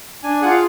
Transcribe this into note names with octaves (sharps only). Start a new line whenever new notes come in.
D4 G#5
F4 G#4 F#5
F5